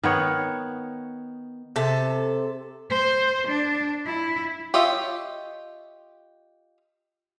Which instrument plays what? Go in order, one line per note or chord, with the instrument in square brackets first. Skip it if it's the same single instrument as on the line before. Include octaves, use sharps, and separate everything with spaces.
[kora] D#3 B3 C#5
[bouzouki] C3 A4
[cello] C5
D4
E4
[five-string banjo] F4 G4 C#5 D#5 E5